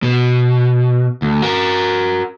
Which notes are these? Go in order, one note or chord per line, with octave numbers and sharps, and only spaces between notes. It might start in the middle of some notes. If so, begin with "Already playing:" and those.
B2
D2
F#4 A#4